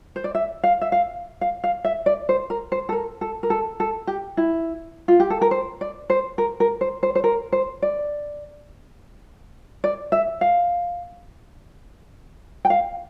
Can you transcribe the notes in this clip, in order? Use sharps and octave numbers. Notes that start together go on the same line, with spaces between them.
C5
D5
E5
F5
E5
F5
F5
F5
E5
D5
C5
A#4
C5
A4
A#4
A4
A#4
A4
A4
G4
E4
F4
G4
A4
A#4
C5
D5
C5
A#4
A#4
C5
C5
C5
A#4
C5
D5
D5
E5
F5
G5
F5